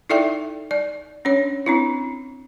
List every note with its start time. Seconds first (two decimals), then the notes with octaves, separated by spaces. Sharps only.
0.10 D#4 E4 A4 D5 E5 G5
0.71 D5
1.25 C#4 D4 C#5
1.66 C4 D4 E4